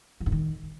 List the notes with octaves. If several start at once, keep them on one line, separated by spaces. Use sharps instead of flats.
F3
G2
D#3